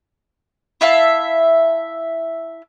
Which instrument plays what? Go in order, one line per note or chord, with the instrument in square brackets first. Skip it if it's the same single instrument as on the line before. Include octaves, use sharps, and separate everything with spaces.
[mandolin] E4 E5 F5 A5